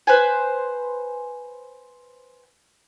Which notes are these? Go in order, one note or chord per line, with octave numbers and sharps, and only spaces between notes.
B4 C5 G#5